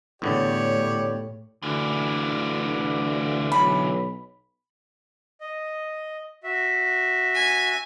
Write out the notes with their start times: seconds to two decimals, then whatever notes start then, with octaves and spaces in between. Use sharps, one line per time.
0.22 E2 A2 D3 G4 C#5 D5
1.62 D2 D3 E3
3.52 B1 B5
5.41 D#5
6.44 F#4 E5
7.35 G#5